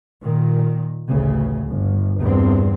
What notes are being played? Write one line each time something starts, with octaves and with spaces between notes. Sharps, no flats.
A#2 D#3
A1 D2 C#3
G1
E2 G2 A#2 C4